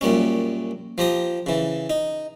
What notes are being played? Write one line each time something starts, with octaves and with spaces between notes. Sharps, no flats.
F#2 A#2 G3 C#4
F3 G4 A#5 D#6
C#3 E3
D#4